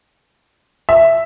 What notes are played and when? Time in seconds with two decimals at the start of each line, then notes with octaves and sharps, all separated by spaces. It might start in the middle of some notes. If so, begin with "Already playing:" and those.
0.89 E5